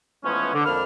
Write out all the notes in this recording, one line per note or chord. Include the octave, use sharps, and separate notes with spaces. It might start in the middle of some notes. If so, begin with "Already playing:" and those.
E3 F3 G#3 A3 B3 C#4
D3
F2 A#3 D4 B5 F6